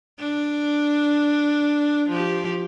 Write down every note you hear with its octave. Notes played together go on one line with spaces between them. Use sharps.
D4
F3 G4